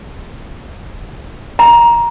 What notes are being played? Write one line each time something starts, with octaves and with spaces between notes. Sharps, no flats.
A#5